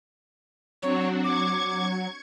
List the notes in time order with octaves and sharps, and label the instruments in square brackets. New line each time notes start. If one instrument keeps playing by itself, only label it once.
[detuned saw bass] F#3 [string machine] C4 D4 F#4 [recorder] C#5
[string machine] C#6 G#6 [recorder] D6